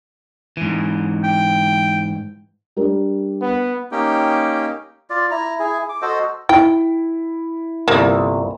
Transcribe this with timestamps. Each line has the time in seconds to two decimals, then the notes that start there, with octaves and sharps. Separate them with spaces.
0.57 G#2 E3
1.24 G5
2.77 G3 D4 A#4
3.41 B3
3.92 A#3 C#4 D#4 G4 G5
5.10 F4 D5
5.31 E4 A#5
5.59 E4 G#4
5.89 D6
6.02 F#4 A4 C5 D#5
6.49 E4 G5
7.88 G1 C2 A#3